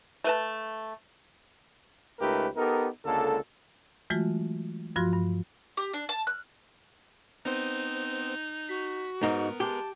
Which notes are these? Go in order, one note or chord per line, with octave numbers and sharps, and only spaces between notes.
A3 B4 A5
C#2 A3 D#4 G4 A#4 B4
B3 D#4 G4 A4 A#4
C#2 D3 G#3 A#3 A4
E3 F#3 G#3 A3 F4 F#4
G2 F3 F4 F#4 C6 A#6
G2
G4
D4
A5
F#6
B3 C4 D#4 C5
F#4 B6
G#2 B3 D#4 A#4
G#3 G4 A5